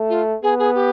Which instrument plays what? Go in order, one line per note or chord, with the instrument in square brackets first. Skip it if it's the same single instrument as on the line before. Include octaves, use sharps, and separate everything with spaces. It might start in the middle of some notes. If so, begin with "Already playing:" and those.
Already playing: [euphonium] A3
[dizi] F4
[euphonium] B3 [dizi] G#4
[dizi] G#4
G4